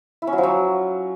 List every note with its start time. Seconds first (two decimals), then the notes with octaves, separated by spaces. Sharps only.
0.22 E4
0.27 C#4
0.33 F#3
0.38 F3
0.43 F#3